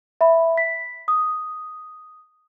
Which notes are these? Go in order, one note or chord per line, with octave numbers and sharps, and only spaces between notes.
E5 B5
B6
D#6